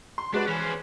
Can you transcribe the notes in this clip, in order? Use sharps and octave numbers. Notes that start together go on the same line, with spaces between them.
C6
G#3 D4 F#4 B4
E3 C#4 C5